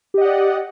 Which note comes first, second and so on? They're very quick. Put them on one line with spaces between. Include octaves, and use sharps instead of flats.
G4 D#5 F#5 D5